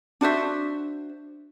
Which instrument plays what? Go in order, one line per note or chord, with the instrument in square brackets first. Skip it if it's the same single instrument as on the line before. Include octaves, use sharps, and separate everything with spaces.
[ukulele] D4 F#4 C5 E5